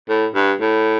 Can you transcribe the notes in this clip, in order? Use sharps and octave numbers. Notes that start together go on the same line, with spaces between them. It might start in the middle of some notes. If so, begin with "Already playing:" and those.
A2
G2
A2